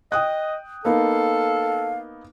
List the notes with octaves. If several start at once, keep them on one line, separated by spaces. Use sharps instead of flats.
D#5 G5 D#6 F#6
A#3 B3 D#4 A4 F5